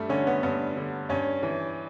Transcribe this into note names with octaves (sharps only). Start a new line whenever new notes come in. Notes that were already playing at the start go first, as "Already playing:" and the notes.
Already playing: G2 G3 A3
D3 C#4
B3
G2 B3
D3
G2 C#4
E3